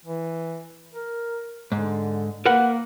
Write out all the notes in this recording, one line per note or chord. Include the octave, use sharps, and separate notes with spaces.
E3
A#4
G#2 D3
A#3 A#4 B4 F#5